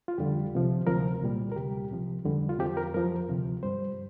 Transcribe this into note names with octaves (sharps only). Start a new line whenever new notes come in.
F4
F2 D3 G3 G4
C2 C3 F3
D2 C3 F3 A#4
C2 A#2 G3
A#4
D2 C3 G3 G4
C2 C3 F3
F2 D3 G3
F4
F2 F3 G4
A#4
F2 F3 A#4
D2 C3 F3
G2 G3 C5